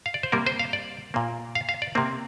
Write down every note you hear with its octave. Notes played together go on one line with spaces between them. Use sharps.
F5
D5
C5
C3 G3 A#3 A#4
C5
F5
D5
A#2 A#3
F5
F5
D5
C3 A#3 C4